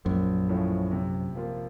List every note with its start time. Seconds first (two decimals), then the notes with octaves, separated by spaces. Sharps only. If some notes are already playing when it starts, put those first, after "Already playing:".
0.05 A#1 F#2
0.49 A2 F3 A3 C#4
0.91 C3
1.35 F3 A#3 F4